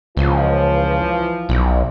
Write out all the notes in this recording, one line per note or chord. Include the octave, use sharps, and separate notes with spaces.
C#2 E3 F3
B1